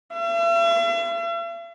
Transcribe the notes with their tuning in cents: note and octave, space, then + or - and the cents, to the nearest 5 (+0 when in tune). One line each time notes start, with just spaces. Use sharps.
E5 +45